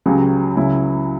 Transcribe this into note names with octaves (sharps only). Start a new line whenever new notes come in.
C#2 C#3 F#3 C#4 G4
C#2 C#3 F#3 C#4 E4